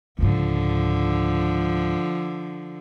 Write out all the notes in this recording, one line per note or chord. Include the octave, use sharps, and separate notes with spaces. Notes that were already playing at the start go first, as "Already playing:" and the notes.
C#2 G#2 D3 F3